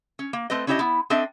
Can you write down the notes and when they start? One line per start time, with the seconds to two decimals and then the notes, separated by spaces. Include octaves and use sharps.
0.19 C#4
0.33 A#3
0.50 A3 C4 B4 D#5
0.67 C#4 D4 E4 G4 D5 D#5
0.79 B3 E4
1.10 C4 D4 A4 D#5 E5